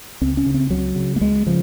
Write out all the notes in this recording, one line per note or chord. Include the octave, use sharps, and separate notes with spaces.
C#2 C4
C#4
C#3
C4
C#2 F#3
C#3
A#3
C#2 G#3
C#3 F3